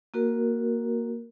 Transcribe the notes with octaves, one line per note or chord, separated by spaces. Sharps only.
A#3 F#4 A#4